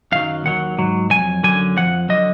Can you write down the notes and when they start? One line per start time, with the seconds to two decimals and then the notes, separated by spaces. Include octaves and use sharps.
0.12 F#2 D#3 F#3 F5
0.44 D#2 D#3 F#3 F#5
0.78 G#2 F#3
1.10 F2 D#3 F#3 G#5
1.43 F#2 D3 F#3 G#5
1.77 F2 F3 F#5
2.09 D3 F#3 D#5